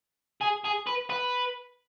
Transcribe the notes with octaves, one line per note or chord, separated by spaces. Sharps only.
G#4
G#4
B4
B4